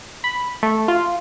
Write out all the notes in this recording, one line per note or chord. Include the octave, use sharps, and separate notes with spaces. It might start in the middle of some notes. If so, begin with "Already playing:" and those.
B5
A3
F4